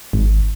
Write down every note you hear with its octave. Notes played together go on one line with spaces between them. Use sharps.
G#1